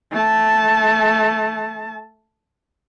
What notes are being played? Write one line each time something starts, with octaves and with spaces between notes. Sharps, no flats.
A3 A5